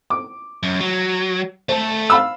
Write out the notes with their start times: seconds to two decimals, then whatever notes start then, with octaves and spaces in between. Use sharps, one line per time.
0.10 D6
0.63 F#2
0.81 F#3
1.69 A3 A4 C5
2.10 F5 B5 E6